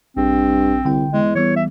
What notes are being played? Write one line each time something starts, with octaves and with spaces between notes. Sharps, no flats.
A#1 G2 C4
C2 D3 G5
E2 G#3
E3 G3 B3 C#5
E5